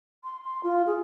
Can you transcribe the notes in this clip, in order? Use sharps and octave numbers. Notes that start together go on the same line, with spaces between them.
C6
C6
F4
G#4